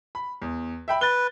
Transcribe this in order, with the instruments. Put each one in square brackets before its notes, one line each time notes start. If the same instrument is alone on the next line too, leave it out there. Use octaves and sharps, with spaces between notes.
[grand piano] B5
E2
E5 G5 B5
[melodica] B4 [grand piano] A6 G7